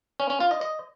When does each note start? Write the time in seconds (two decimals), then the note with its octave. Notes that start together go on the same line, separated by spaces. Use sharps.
0.20 C#4
0.30 C#4
0.40 F4
0.51 D#5
0.61 D#5